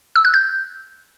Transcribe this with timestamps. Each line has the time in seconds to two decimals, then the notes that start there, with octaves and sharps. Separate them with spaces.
0.16 E6
0.25 F#6
0.34 G6